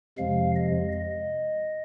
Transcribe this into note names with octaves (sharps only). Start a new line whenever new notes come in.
F2 C3 F3 G#3 F5
D#5
D#5